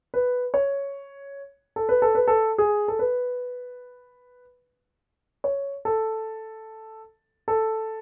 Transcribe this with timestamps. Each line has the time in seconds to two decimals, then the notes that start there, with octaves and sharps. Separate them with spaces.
0.14 B4
0.54 C#5
1.76 A4
1.89 B4
2.02 A4
2.15 B4
2.28 A4
2.58 G#4
2.88 A4
2.99 B4
5.44 C#5
5.85 A4
7.48 A4